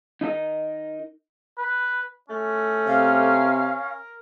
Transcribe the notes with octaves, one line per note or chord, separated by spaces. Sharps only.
D#4 E4 A4 A#4 D#5
B4
A3 C#4
C3 F5
A#4